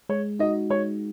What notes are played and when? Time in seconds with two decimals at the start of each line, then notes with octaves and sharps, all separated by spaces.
0.09 G#3 C#5
0.39 D#4 F#4 D#5
0.70 G#3 C#5